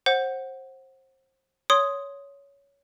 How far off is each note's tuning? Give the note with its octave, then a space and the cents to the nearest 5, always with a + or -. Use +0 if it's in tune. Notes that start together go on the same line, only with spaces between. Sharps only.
C5 +25 F#5 +5
C#5 +15 C6 +5 D#6 +0